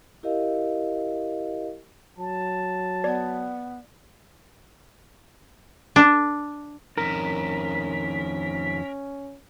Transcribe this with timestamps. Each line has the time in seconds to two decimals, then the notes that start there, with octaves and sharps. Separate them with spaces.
0.23 E4 G4 A#4 D#5 F5
2.18 F#3 A5
3.04 B3 D5
5.96 D4
6.98 F2 D#3 C#4 A#4 B6